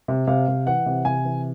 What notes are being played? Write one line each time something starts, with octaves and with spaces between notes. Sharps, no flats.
C3
C3 F5
C3
E3 F#5
C3
C3 G#5
E3